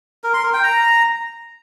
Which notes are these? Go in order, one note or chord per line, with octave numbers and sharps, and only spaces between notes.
A#4
C6
A#4
G5
A#5